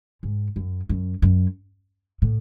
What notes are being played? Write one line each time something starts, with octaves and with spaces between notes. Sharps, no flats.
G#2
F#2
F#2
F#2
A2